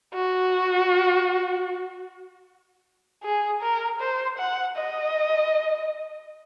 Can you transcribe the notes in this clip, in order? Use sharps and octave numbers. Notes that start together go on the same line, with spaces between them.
F#4
G#4
A#4
C5
F#5
D#5